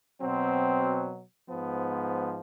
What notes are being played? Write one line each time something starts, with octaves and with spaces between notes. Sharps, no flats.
B2 F#3 C4
G#2 F3 B3